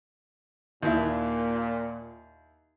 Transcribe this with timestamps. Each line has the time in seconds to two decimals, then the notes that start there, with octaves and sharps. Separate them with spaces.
0.83 D#2 A#2 E4